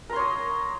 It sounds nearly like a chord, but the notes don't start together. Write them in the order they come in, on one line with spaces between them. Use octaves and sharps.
A#4 C6 C#5 D#6